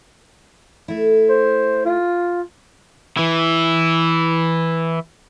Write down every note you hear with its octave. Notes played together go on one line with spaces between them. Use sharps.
A3 E4
C5
F4
E3 E4